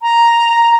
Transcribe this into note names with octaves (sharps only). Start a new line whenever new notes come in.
A#5